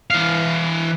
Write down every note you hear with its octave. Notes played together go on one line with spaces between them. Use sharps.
E3 F5